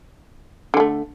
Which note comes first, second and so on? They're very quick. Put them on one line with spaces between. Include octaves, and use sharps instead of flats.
D3 G#3 A3